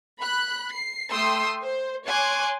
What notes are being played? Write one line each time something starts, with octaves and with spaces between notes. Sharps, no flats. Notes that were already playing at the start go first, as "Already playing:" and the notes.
B5 F#6
C7
A3 G5 C6 D#6 E6
C5
C#5 G#5 C6 D6 F#6